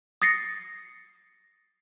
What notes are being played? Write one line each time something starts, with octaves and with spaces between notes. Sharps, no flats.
D#6 A6 A#6 C7 C#7